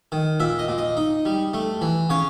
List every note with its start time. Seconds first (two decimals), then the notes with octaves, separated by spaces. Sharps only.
0.12 D#3
0.40 A#2 E5
0.59 D#5
0.68 A#2
0.78 D#5
0.97 D#4
1.25 G3
1.54 A3
1.81 E3
2.10 C#3 C#5